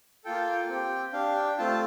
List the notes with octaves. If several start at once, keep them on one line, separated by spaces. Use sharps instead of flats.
A#3 F4 A4 G5
C4 G4
D4 G4 F5
G5
A3 C4 F4 A5